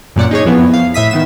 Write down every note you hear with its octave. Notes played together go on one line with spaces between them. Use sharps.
F#2 A#2 D5 F#5
D#4 G#4 C#5
F2 E3 B3
F5
A2 E5 D#6 B6
D#3 B3 E7